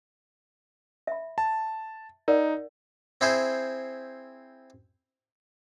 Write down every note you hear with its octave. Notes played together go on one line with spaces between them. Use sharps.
E5 B5
A5
D#4 A#4 D5 F#5
C4 E4 G#4 C5